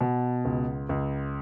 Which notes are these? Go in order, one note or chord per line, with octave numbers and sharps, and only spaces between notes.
B2
C#2
C#2